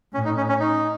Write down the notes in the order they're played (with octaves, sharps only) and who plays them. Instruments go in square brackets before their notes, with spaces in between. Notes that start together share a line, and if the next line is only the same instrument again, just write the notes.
[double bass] A2 [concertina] C#4
[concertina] D#4
C#4
C#4
D#4